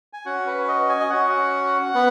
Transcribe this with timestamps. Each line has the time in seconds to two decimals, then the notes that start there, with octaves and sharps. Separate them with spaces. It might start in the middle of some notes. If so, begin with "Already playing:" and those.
0.13 G#5
0.26 C#4 F#4 F#5
0.47 B4
0.68 D#5
0.89 G#5
1.00 D#5
1.10 C#4 F#4 F#5
1.95 B3